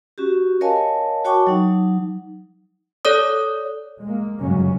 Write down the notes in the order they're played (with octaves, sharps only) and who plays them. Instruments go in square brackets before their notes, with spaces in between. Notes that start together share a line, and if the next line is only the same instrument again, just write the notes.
[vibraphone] C#4 F#4 G4
A#4 C#5 D#5 F5 G#5 A5
F#4 C#5 G5 A5 C#6 D6
F#3 D#4
[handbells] A4 C#5 D5 D#6
[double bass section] G#3 A#3
G1 F#2 C#3 F#3 G#3 C#4